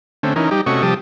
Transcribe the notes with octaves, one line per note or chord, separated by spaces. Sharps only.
D3 A3 C4 C#4
E3 C#4 D#4 A#4
G3 D#4 G4
C3 A3 C#4 F#4 D#5 C#6
C3 F3 G3 G4 A5 D#6